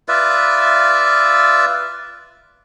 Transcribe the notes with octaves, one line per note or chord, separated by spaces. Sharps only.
F4 B4 D5 E5